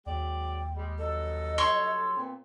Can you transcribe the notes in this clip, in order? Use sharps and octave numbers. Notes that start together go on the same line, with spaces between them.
D#2 F#3 G#3 D5 G5
G3 G#3
G2 F#3 A4 D#5
C#5 C6 C#6
A#2 B3 C4